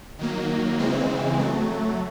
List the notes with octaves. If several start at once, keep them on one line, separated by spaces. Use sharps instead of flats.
D#3 F#3 A#3
C#3 E3 G#3 C4
F#3 A3